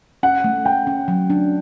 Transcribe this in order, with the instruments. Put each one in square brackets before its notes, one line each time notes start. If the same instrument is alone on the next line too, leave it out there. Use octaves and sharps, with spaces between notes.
[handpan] C#4 [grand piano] F#5
[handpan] A3
[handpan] A3 [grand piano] G5
[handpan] C#4
F#3
D4